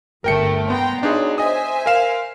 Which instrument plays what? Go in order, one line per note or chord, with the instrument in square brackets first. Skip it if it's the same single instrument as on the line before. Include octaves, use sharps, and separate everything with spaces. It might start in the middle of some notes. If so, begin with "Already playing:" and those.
[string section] G1 D2 A3 [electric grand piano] A#4 G5 C#7
[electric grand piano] B3 [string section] G5 A#5 C6
[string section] B1 [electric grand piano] D4 D#4 G#4
[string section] C5 E5 G#5 [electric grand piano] D#5 D#6
[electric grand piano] A#4 F5 E7